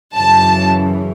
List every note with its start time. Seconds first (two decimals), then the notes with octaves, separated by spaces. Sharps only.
0.16 F#2 C#3 E3 A5